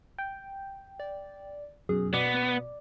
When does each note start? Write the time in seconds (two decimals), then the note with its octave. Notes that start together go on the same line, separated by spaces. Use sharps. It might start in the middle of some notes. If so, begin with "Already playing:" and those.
0.18 G5
1.00 D5
1.89 F#2 B2 G#4
2.14 B2 B3 D5